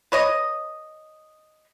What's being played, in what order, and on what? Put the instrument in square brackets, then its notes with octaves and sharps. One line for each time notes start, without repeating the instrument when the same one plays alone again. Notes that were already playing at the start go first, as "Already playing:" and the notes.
[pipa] B4 C#5 D#5